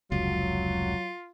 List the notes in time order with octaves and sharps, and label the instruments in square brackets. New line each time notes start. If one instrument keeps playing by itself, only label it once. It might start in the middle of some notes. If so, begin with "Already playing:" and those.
[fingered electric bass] F1 C#2 [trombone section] F#3 [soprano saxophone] F4